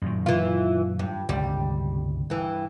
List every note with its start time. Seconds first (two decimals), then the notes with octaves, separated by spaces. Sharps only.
0.02 F#2 A#2 D#3
0.26 E3 F4
0.99 G2
1.29 G1 C#2 C3 G3
2.30 G2 E3